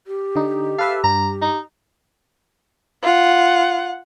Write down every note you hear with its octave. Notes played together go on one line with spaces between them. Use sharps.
G4
D3 D#4
A4 B4 E5 F5
G2 A#5
D#4
F4 F#5